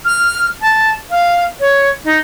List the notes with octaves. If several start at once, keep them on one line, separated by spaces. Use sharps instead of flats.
F6
A5
F5
C#5
D#4